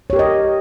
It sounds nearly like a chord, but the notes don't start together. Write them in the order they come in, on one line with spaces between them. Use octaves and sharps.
C#5 G4 A#4 D#5